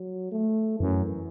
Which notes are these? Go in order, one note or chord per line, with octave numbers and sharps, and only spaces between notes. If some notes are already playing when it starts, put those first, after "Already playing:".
Already playing: F#3
A3
F#2 E3